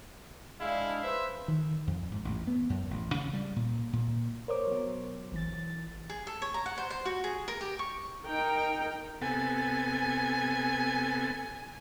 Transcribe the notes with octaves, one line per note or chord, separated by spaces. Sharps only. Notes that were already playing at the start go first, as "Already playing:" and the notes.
G#3 D4 E4 F5
B4 C5 E5
D#3
F2
G#2
A1
B3
F#2
A1
C#3
G3
A#2
A#2
A#4 C5 C#5 D6
B2 F#3
G#1 E3 A6
G#4
A4
C#5
A#5
F#5
C5
C5
F#4
G#4
A#4
G4
C#6
D#4 A#4 G5
C3 B3 A4 G#5